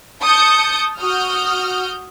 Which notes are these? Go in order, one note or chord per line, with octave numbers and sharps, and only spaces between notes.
A5 D#6 G6 C#7
F#4 D#6 F6 G6